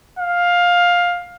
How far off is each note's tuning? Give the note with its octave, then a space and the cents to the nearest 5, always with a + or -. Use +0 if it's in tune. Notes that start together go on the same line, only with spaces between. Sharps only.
F5 +10